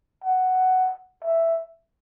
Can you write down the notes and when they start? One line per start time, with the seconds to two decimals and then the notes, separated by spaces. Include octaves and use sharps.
0.24 F#5
1.24 E5